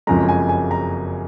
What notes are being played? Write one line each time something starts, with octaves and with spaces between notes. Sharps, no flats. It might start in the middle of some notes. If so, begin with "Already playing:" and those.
F#1 F2 C#3 F3 G#3 A#5
G#5
G#5
A#5